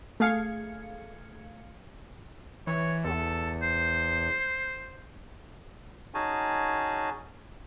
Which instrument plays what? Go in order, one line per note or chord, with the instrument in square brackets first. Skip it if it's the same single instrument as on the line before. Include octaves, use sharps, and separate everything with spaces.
[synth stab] A3 G#4 F5 G#6 C#7
[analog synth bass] E3 [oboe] C#5
[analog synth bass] E2 [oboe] A4
[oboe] C5
[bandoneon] C#4 D#4 F#4 G#4 G#5 A5